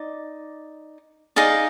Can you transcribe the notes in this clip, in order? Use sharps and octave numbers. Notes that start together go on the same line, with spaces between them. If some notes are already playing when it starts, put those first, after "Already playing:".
Already playing: D#4 D5
D#4 G#4 D5 F5